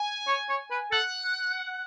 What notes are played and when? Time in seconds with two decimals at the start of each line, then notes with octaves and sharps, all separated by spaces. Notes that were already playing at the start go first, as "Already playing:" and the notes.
Already playing: G#5
0.28 C#5
0.49 C#5
0.71 B4
0.91 A4 F#5